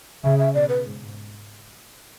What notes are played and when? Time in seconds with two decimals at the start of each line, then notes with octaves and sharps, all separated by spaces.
0.24 C#3 E5
0.39 E5
0.55 B2 D5
0.69 B4
0.85 G#2